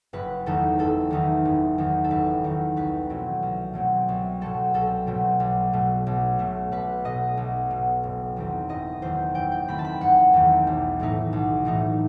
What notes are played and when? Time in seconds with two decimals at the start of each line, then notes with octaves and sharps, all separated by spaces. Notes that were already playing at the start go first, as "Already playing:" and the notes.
0.13 F#1 B4
0.46 E2 D#3 A3 D#4 A4
0.79 F#1 A4
1.10 E2 D#3 A3 D#4
1.45 F#1
1.78 E2 D#3 A3 D#4
2.04 A4
2.10 F#1 B4
2.44 E2 D#3 A3 D#4
2.76 C2 B4
3.10 B2 F#3 A3 C4
3.43 C2
3.73 B2 F#3 A3 C4
4.08 C2
4.41 B2 F#3 A3 C4 A4
4.74 C2 A4
5.07 B2 F#3 A3 C4
5.40 B1
5.73 B2 A3
6.07 B1
6.39 B2 A3
6.72 B1 B4
7.05 B2 A3 D#5
7.37 B1
7.70 B2 A3
8.03 F#1
8.36 E2 D#3 A3 C4
8.69 F#1 D#5
9.02 E2 D#3 A3 C4 C5
9.35 F#1 G5
9.52 G5
9.68 E2 D#3 A3 C4 B5
9.79 A5
9.84 B5
10.01 F#1 F#5
10.34 E2 D#3 A3 C4
10.67 B1
11.00 A2 E3 A3 D#4
11.33 B1
11.65 A2 E3 A3 D#4